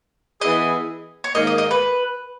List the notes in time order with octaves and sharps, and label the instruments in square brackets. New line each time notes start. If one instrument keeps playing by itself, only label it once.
[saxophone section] E3 B3 E4 G#4 [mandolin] D#5
[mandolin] C#5
[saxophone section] G#2 D#3 A#3 [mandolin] D#5
[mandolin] D#5
D#5
B4